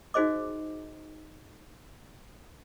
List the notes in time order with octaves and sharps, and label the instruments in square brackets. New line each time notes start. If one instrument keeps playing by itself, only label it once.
[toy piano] D#4 F#4 G#4 C5 D#5 D6